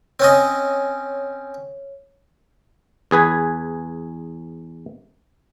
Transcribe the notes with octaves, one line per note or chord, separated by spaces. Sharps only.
C4 C#4 C#5 D#5
E2 G#4 B4 G#5